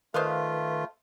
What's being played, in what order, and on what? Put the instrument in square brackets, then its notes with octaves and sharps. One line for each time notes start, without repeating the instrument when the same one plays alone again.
[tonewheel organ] D#3 B4 [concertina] A3 F4 [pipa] C5 D#5 F5